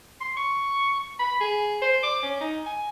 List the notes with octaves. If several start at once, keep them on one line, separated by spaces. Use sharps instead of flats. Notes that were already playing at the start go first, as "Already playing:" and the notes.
C6
C#6
B5
G#4
C5
D6
C#4
D#4
G#5